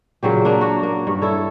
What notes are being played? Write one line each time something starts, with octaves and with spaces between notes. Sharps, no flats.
A#2 C#3 F#3 G4
A#3 D4
F#4
A#3
G2
E4 A4 C#5